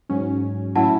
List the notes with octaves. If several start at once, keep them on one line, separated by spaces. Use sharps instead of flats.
G#2 F#3 C#4
A2 F#3 C#4 E4 F#5 A5